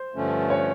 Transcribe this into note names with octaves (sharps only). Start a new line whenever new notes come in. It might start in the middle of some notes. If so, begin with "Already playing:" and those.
Already playing: C5
G2 D3 F3 A3 C#4
C#5